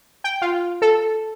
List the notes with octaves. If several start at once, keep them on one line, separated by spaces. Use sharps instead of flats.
G5
F4
A4